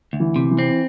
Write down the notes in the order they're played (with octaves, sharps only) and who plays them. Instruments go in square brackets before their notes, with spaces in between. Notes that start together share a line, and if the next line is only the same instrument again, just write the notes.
[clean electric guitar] D2
[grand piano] E3
[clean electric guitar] C3
[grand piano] E3
[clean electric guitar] C4